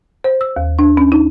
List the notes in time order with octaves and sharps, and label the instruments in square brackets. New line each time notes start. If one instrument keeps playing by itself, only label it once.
[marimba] C5
E6
D#2
D4
C#4
D#4